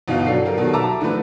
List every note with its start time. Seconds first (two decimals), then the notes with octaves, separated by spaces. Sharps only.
0.08 G1 B2 E3 D#4 F5
0.26 F#3 D4 A4 C7
0.45 G4 A4 A#4
0.58 B2 D#3 F#3
0.73 E5 A5 A#5 D6 E6
1.01 D3 E3 F3 A3 B4